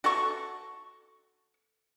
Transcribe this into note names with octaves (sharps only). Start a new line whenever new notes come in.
F#4 A4 E5 C#6